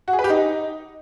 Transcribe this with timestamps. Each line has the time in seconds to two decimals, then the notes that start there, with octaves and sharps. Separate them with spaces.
0.08 F#4
0.13 G#4
0.19 B4
0.24 G4
0.30 D#4